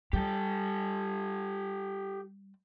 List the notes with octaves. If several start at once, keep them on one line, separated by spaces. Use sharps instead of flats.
G3 G4 A4